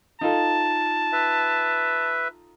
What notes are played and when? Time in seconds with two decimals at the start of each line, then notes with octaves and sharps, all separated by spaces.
0.21 D#4 F4 A4 A5
1.13 B4 E5